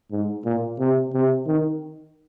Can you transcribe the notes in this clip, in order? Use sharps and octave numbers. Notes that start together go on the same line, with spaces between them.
G#2
A#2
C3
C3
D#3